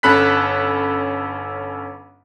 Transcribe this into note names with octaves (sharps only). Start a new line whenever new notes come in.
G1 C#4 A4 B5 F#6 B6